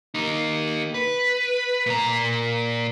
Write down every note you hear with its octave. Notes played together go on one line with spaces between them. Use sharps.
A#3 D#4
B4
A#2 A#5